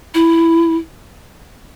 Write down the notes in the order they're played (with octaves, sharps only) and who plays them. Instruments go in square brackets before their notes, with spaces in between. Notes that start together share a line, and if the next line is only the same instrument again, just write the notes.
[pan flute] E4